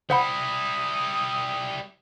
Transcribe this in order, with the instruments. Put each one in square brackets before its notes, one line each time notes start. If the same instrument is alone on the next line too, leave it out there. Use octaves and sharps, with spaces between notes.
[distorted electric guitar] G3 E4 [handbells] C5 F#5 B5 [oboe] D#6